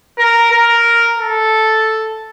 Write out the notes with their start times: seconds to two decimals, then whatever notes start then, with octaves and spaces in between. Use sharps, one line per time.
0.18 A#4
0.51 A#4
1.19 A4